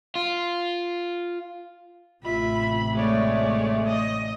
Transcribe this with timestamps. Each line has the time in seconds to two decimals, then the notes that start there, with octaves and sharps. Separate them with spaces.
0.15 F4
2.24 A1 C3 F4 E5 B5
2.96 G#3 A3 C#5 D5
3.88 D#5